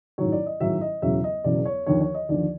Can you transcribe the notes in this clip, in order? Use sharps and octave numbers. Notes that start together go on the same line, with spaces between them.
A1 G#2 D#3 F#3 C#5
D5
D#5
A1 G#2 D#3 F#3 E5
D#5
E1 E2 C#3 F#3 E5
D#5
E1 E2 C#3 F#3 D5
C#5
D#2 D3 F3 C#5
C#5
D#5
D#2 D3 F3 D5